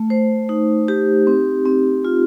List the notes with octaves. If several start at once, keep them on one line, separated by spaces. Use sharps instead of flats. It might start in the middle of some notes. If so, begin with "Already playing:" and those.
Already playing: A3
C5
D#4
G4
C4
C4
F4